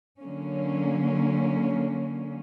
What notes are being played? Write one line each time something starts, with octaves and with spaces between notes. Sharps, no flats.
D3 F#3 A#3 C#4